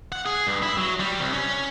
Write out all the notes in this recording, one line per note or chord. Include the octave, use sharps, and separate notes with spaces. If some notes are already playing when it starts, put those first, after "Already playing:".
F#5
G#4
G2
E4
F#3
G3
C2
C#4